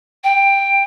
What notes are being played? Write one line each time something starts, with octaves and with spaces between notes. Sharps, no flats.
G5